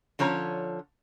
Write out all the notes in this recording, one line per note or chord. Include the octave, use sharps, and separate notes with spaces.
D3 F3 C#4 C#5 A#5